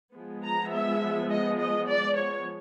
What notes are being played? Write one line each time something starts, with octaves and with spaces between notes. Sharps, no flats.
F3 G#3 B3
A#5
E5
D#5
D#5
D5
C#5